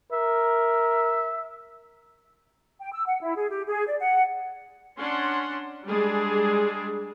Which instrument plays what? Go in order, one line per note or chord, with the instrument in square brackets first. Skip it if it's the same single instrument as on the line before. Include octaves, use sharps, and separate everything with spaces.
[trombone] A#4 [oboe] E5
[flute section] G5
E6
F#5
E4
G#4
G4
G#4
D5
F#5
[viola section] C#4 D4 F#5 C6
G3 G#3 D4 G#4